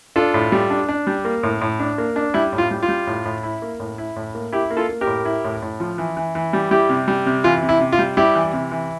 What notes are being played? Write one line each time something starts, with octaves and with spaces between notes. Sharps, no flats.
D4 F4 A4
A2
G3
D4
D4
G3
A#3
A2
A2
D4
A#3
D4
G3 E4
A2
F4
G3
F4
G3
A2
A2
E4
A#3
A2
E4
A2
A#3
E4 G4
A#3
F4 A4
A#3
G4 A#4
A2
E4
A2
A2
F3
E3
E3
E3
G3
G3 E4 G4
C3
G3
C3
E3 F4
C3
E4
C3
F4
G3
G3 E4 G4
E3
C3
E3